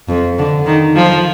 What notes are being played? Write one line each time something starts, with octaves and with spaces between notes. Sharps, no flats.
F2
D3
D#3
F3